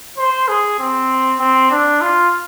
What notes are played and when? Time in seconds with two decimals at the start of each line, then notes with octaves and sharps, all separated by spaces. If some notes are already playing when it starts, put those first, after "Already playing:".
0.18 C5
0.48 G#4
0.79 C4
1.40 C4
1.71 D4
2.01 F4